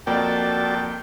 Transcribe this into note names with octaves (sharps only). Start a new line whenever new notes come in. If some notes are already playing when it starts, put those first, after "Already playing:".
F2 A#3 F#4 D5 G5 A5